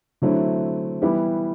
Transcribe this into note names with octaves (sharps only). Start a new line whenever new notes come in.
D3 F#3 A3 C4 E4
E3 G3 B3 E4 G4